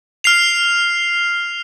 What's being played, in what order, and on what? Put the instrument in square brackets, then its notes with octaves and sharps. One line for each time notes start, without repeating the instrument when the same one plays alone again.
[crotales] F6 C7 F7